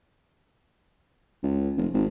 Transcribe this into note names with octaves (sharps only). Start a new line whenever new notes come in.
C#2
F1
G#1